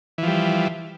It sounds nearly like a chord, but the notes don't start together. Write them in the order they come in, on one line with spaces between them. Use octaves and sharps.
E3 F3 G3